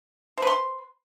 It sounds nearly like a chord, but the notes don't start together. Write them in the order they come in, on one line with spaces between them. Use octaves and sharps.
C5 B4 C6